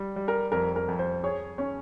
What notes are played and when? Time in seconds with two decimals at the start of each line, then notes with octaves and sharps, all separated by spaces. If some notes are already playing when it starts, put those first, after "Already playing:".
Already playing: G3
0.16 G3
0.28 A#4
0.52 F2 A#4
0.76 A#4
0.88 F2
0.99 C5
1.23 G#4 C#5
1.58 C#4 C#5